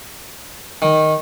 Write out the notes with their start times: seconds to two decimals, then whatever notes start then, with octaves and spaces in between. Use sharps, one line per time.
0.82 D#3